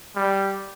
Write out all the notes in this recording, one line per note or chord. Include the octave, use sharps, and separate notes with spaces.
G3